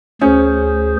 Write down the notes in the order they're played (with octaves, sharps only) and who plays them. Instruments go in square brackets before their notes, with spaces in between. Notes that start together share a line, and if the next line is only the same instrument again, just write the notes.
[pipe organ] D2 G#4 C5 [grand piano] C#4